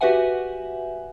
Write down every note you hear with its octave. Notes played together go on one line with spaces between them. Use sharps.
F#4 G4 B4 E5 F#5 G#5